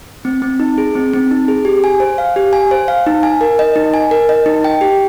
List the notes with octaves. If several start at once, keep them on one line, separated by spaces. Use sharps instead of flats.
C4
C4
D#4
G#4
C4
C4
D#4
G#4
G4
G#5
C5
F5
G4
G#5
C5
F5
D#4
G#5
A#4
D#5
D#4
G#5
A#4
D#5
D#4
G5
G4